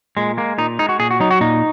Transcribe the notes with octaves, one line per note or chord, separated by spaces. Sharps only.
A#2 G#3
G#3 A#3
A#2 D#4
G#3 D#4
F#4
A#2 G#4
F#4
F#3 D#4
F#4
A#2 D#4